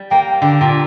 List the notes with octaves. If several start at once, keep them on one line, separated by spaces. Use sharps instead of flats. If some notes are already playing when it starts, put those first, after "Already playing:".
Already playing: G3
A#3 G5
D3 G5
A#2